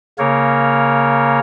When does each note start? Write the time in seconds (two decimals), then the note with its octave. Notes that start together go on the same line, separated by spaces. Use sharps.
0.19 C#3 A#3 A#4 C#5